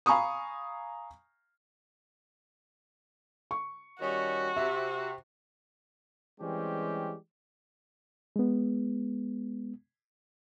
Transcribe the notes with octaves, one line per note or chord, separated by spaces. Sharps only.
F5 G#5 A#5 B5 C#6 D#6
C#6
D#3 G3 C#4 F#4
C3 E5
E3 G3 G#3 C4 C#4 G4
G#3 B3